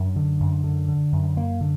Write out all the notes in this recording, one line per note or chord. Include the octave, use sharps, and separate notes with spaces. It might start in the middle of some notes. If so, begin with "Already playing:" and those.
Already playing: F#2 D4
D3
F#2
D3
D3
F#2
F#2 A#3
D3